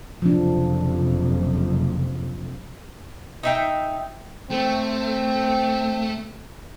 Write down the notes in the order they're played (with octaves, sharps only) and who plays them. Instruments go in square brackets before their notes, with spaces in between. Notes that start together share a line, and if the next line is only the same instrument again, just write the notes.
[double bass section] F#1 F2 C3 [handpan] F3 D4
[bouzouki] D#4 E5 G5
[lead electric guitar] A3 [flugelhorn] C4